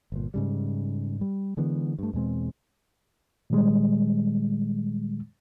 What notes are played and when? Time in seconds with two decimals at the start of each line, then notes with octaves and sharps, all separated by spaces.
0.12 G1 A#2
0.34 G#2 C#3 G3
1.21 G3
1.57 D3 E3 G#3 B3
1.99 G2 A3
2.13 E2 B2 G#3 C4
3.50 A#2 D#3 G3 G#3